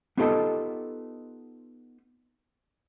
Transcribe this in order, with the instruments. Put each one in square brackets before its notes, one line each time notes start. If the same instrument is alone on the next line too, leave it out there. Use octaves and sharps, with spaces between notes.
[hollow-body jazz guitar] B3 D#4 F4 G4 A4 D#5